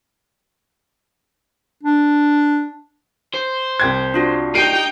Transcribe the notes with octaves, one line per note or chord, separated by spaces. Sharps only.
D4
C5
C2 G5 G#6
D4 F4 F#4
D#4 G4 G5 C7 D7 D#7